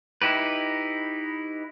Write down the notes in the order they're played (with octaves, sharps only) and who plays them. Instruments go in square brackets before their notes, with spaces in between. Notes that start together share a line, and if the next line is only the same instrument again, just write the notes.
[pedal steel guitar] D#4 E4 G4 B4